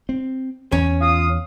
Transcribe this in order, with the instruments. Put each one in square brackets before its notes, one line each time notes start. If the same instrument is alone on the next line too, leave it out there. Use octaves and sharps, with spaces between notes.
[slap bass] C4
[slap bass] E2 [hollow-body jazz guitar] C#4
[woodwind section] F4 F5 D#6